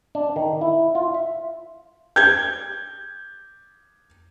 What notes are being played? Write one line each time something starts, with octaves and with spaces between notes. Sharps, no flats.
D4
D#3
E4
F4
E5
G6 G#6